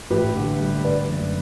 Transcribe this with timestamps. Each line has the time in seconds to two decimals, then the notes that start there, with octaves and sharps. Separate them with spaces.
0.10 A1 G4 B4
0.35 D3
0.60 G3
0.84 D3 B4 D5
1.08 F#1